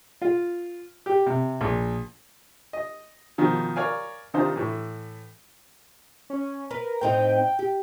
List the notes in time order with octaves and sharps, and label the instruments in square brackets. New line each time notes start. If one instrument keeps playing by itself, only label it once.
[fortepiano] F4
G4
C3
A#1
D#5
B2 D#3 F3
A#4 C#5 D5 F5 G#5
C3 D#3 D4 D#4 F4 C5
A2 E3
[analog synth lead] C#4
[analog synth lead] A#4 [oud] B4
[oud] A2 C4 D#4 [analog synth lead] G5
[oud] G4